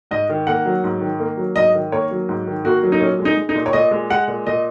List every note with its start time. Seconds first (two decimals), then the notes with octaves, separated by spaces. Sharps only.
0.11 G#2 D#5
0.29 D#3
0.47 A#3 F#5
0.66 F#3
0.84 G#2
1.01 D#3
1.20 A#3
1.37 F#3
1.56 G#2 D#5
1.74 D#3
1.92 A#3 C#5
2.11 F#3
2.29 G#2
2.47 D#3
2.65 A#3 F#4
2.83 F#3
2.92 D#4
3.01 A#2 C#4
3.19 G#3
3.25 D#4
3.37 G#3
3.49 D#4
3.55 A#2
3.66 C#5
3.73 A#2 D#5
3.91 G#3
4.10 G#3 F#5
4.28 A#2
4.47 A#2 D#5